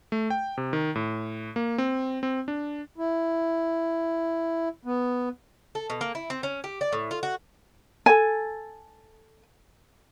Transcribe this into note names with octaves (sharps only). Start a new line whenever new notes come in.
A3
G5
C3
D#3
A2
A#3
C4
C4
D4
E4
B3
A4
B2
A#3
E4
C4
C#4
G4
D5
A2
F4
F#4
A4 G#5